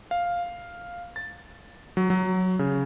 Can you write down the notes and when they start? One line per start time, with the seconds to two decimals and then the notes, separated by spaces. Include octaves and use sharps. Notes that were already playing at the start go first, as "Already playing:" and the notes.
0.11 F5
1.16 A6
1.97 F#3
2.10 F#3
2.59 C#3